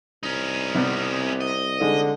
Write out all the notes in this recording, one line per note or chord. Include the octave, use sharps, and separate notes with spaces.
C2 C#4 D#4
C3 G3 B3
D#5
D3 G#3 D#4